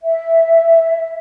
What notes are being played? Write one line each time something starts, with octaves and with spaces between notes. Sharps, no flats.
E5